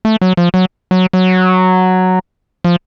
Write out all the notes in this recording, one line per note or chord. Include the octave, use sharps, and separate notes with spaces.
A3
F#3
F3
F#3
F#3
F#3
F3